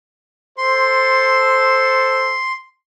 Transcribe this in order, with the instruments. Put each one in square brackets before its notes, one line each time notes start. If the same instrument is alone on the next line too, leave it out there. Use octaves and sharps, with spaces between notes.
[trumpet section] A4 C5 [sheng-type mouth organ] C6